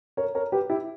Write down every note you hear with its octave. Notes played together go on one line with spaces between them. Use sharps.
A#4 C#5
A#4 C#5
G4 B4
E4 G4